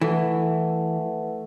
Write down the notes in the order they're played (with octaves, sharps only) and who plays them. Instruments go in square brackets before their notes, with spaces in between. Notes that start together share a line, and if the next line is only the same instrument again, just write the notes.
[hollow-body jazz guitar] E3 [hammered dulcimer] A3 [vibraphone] B4 E5 F#5